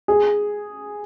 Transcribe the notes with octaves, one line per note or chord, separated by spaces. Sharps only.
G#4